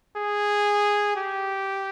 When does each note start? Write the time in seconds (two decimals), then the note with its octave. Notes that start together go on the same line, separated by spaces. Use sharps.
0.17 G#4
1.16 G4